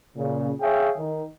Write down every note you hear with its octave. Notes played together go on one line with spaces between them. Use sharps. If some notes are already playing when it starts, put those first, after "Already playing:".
A#2 C#3
G#4 C#5 E5 F5 G5
D#3